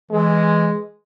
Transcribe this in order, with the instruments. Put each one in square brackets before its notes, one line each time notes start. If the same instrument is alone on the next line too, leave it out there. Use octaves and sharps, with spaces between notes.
[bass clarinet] E3 [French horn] G#3